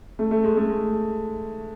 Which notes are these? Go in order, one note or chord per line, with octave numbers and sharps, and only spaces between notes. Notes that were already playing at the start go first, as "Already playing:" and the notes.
A3
A3
G#3
A3
G#3